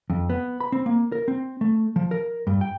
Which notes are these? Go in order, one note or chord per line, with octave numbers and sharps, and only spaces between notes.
F2
B3
B5
C4
A#3
A#4
C4
A3
F3
A#4
G2
G5